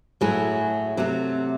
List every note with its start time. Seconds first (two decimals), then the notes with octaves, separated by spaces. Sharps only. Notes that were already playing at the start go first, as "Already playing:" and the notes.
0.21 A2 F#3 A3 E4 G#4
0.97 C3 F#3 A3